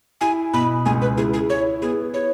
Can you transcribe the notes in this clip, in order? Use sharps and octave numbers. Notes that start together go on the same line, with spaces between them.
E4 G#5
B2 B5
C#2 G#5
B4
E4 G#4
G#4
E4 C#5
B3 G#4
E4 C#5